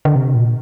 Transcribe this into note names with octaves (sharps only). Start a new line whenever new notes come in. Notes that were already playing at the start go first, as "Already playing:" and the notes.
D3
C3
A#2